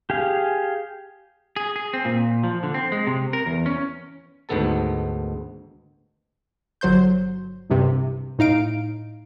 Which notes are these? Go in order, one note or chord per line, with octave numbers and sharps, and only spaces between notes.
G4 G#4 F5
G#4
G#4
C4
A#2
F3
D3
C4
G#3
C3
A#4
E2
C#4
D2 G#2 D#3 B3 A4 A5
G1 F#3 C5 C6 G6
C2 G2 C3
A2 D#4 F5 D7